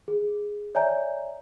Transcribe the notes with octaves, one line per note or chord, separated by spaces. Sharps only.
G#4
C#5 D5 E5 G#5 A#5 G6